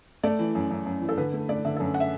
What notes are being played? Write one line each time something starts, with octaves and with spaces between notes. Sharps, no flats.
A3 D5
E3
F#2
F#2
F#2
E3
A4
D3 B4
A3
A3 D5
D3 E5
A4
F#2
F#5
E5